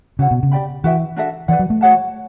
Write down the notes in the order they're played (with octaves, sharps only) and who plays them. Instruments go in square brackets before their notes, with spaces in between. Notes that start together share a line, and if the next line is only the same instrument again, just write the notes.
[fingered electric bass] C#3 [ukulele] F#4 C#5 F#5 A5
[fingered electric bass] B2
C#3
[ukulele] G4 D5 G5 B5
[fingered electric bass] E3 [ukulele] F#4 B4 E5 G5
[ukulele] D4 F#4 A4 E5
[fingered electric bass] E3 [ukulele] B4 D5 F#5
[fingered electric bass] F#3
A3
[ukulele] F#4 C#5 F#5 A5